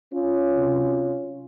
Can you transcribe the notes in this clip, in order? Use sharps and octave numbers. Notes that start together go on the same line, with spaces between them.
C#4 F4
C3 F#3